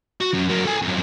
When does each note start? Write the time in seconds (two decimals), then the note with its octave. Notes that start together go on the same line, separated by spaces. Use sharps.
0.21 F#4
0.34 F#2
0.50 F#3 A#3
0.66 A4 G#5
0.82 F2 F#3